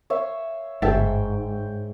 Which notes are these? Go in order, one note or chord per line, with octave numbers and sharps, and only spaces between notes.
C#5 E5 F5
G1 G#2 E5 G5 A5